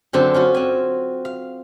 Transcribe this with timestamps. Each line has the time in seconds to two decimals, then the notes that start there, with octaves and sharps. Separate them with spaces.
0.13 F#2 D3 C4 C5 A5
0.34 C#4 F4 F#4
0.54 C4 G#5
1.25 F5